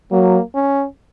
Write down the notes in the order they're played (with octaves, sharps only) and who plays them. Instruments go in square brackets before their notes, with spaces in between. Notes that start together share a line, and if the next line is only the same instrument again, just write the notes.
[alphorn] F#3 [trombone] A#3
[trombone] C#4